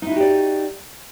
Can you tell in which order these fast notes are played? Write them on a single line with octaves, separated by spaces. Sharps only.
D#4 E4 F#4 G4 D5